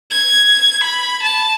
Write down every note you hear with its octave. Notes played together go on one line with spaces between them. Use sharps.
G#6
B5
A5